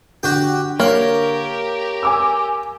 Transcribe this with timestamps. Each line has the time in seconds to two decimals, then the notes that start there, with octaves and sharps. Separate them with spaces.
0.23 D3 F#4 G4 G5
0.80 A#3 G4 A#4 C#5
2.03 G#5 D6 E6